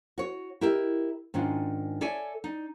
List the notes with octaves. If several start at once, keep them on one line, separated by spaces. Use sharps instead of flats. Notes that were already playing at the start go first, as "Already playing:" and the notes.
F#4 C#5
E4 G4 A#4 D#5 E5
G#2 D#3 C#4 D4 F4
A4 C#5 D5 E5 G#5
D#4 D5